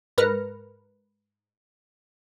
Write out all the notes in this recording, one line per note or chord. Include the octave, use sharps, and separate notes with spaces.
G#2 A#4 B4 F6 A#6 C#7